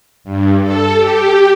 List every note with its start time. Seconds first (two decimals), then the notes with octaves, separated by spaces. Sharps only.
0.24 G2
0.62 A4
0.96 G4